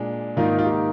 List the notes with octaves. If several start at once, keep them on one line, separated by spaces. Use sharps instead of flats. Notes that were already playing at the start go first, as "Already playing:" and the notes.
Already playing: A#2 G#3 D4
G#2 D#3 A#3 D#4 F4
F4
G4